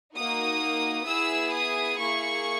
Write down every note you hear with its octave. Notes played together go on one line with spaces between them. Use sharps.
A#3 D#4 F#4 D#6
B3 E4 G#4 E6
D#6
A#3 E4 G#4 C#6